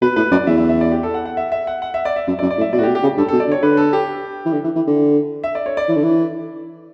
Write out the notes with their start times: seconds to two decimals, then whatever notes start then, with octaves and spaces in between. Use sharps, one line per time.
0.02 B2 B4
0.16 A2 B4
0.31 F#2 D5
0.47 E2 E5
0.57 E5
0.69 E5
0.81 D5
0.92 G4
1.03 A4
1.14 F#5
1.25 F#5
1.37 E5
1.52 E5
1.67 F#5
1.82 F#5
1.94 E5
2.05 D5
2.16 E5
2.27 F#2 E5
2.39 D5
2.42 F#2
2.50 D5
2.58 A2
2.61 E5
2.73 B2 D5
2.78 A2 F#4
2.83 G4
2.88 B2
2.95 G4
3.03 C#3
3.07 G4
3.17 G2 A4
3.29 B2 A4
3.40 D5
3.48 D3
3.52 C#5
3.63 D3 B4
3.77 A4
3.93 G4
4.46 E3
4.53 D3
4.64 E3
4.76 E3
4.87 D3
5.44 E5
5.55 D5
5.66 C#5
5.77 D5
5.89 E3
5.96 D3
6.04 E3